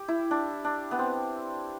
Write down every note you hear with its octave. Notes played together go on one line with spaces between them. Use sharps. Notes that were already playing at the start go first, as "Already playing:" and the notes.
Already playing: G4
E4
D4
D4
B3
C4